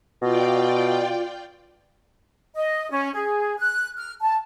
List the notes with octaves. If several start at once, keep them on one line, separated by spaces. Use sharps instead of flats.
B2 F4 D5 G5
D#5
C#4
G#4
F#6
F6
A5